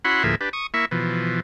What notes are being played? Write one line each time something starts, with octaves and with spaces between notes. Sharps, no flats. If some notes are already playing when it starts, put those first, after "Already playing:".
C#4 E4 F#4 F#5 B5 C6
D2 A2 F3 A#3 G#4 E5
D4 G4 B4
C#6 D#6
A#3 E4 E5 C#6
B2 E3 F3